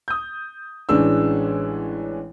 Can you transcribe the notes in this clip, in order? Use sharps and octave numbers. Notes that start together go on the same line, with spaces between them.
D#6 G6
A1 E3 G#3 C#4 D4 E6